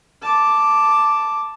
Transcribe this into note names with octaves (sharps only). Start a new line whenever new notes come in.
A5 D6